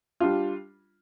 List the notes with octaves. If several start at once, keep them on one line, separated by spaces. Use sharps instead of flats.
G3 D4 F4